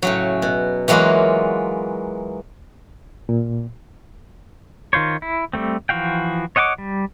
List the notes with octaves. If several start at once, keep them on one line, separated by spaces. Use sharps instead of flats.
A2 C#3 F#3
B2
E3 F#3 G#3 A#3 F4 F#4
A#2
D#3 F4 C5 C#5
E4
G3 A3 C4
E3 F3 F#4 F5 G5
C#5 D#5 F#5 G5 D6
G3